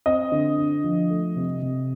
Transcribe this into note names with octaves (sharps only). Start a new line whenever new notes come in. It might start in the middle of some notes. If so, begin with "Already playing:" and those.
C4 D#5
D3
D3
F3
A3
C3
C3